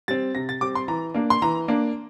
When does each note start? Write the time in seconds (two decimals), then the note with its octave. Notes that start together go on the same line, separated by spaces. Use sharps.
0.08 G3 C4 A6
0.35 C3 A#6
0.49 A6
0.61 G3 C4 D6
0.75 C6
0.88 E3 A#5
1.15 A#3 D4
1.30 C6
1.42 E3 A#5
1.68 A#3 D4